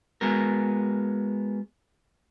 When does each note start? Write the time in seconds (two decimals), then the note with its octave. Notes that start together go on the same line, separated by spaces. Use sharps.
0.21 G#3 B3 F#4 A#4